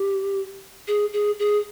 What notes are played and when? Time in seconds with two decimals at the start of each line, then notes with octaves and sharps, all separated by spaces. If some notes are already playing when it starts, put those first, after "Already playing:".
Already playing: G4
0.88 G#4
1.13 G#4
1.39 G#4